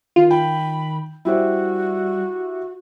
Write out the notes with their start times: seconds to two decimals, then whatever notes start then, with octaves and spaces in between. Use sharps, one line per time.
0.16 D#3 F4
0.31 G5 B5
1.25 G3 E4 F#4 G4 C5